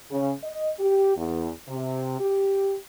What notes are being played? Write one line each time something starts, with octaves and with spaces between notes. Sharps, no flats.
C#3
D#5
G4
E2
C3
G4